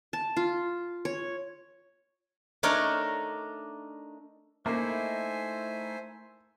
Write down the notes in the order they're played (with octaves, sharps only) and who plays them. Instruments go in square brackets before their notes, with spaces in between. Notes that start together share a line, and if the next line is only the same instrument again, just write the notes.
[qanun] A5
F4
C#5
[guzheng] A3 D4 D#4 A#4 C#5
[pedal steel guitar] A3 D#4 E4 [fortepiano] A#3 [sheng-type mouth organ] C5 E5 G#5